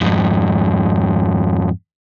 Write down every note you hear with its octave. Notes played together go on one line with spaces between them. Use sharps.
F2 G#2